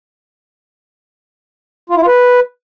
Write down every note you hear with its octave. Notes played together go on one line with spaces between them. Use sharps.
F4
E4
F4
B4